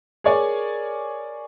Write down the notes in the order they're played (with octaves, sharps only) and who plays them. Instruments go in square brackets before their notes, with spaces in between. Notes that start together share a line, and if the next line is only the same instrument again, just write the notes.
[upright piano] G#4 A#4 C#5 D5 G#5